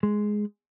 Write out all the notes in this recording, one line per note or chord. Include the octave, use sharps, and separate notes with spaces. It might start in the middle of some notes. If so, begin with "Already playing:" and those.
G#3